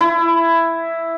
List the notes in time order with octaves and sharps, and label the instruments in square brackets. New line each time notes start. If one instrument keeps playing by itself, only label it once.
[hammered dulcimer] E4